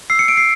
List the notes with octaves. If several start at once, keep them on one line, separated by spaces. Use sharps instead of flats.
E6 C7
C#7
E6 D7
C7